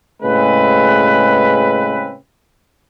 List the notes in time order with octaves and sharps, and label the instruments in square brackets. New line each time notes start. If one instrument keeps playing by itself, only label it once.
[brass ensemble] A2 C#3 G#3 C4 B4